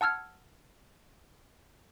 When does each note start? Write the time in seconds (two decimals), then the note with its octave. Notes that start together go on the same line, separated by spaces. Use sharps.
0.01 F#5 A5 E6 F6 G#6